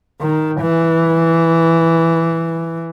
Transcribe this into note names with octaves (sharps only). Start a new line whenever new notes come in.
D#3
E3